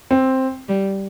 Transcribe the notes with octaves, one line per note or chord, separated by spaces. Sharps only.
C4
G3